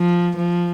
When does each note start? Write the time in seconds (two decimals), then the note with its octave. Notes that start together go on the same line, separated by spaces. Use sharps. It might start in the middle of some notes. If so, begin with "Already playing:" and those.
Already playing: F3
0.37 F3